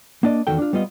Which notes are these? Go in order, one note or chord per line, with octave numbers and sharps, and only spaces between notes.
A#3 D4 D5 D#5
E2 D#3 F#4 A4 G5
D4 F4
G3 B3 F4 D#5